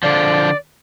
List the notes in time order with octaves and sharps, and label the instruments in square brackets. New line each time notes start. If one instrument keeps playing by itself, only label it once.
[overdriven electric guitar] D3 F3 [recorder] D5